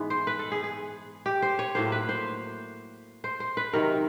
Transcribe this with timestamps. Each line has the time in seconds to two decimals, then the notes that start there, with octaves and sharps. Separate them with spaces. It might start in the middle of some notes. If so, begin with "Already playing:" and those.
Already playing: G#2 E3 G#3 B3
0.10 C5
0.27 B4
0.39 A4
0.52 G#4
0.64 G#4
1.26 G4
1.42 C5
1.59 C#5
1.75 A2 F#3 A#3 C5
1.92 B4
2.09 C5
3.24 C5
3.40 C5
3.57 B4
3.73 C3 D#3 F#3 A#4